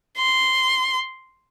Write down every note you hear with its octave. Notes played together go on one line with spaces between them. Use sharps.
C6